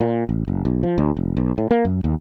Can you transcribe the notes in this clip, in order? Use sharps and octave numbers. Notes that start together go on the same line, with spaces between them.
A#2
A1
F#1
B1
F3
D2
F1
B1
A2
A#3
F#2
D#2